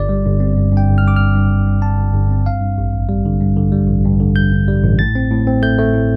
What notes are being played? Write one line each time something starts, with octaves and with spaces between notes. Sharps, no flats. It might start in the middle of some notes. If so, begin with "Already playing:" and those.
Already playing: G1 D5
G3
G1
C4
G2
G2
G5
G1
F6
G2 D6
G2 F6
G2
G1
G2
G2 A5
G1
G1
C4
G2 F5
G2
A1
A1
G3
D3
G2
D3
G3
A1
G2
D3
G2 G6
G2
G3
A1
A2 A6
C4
A2
C4
A3 G6
A3
A2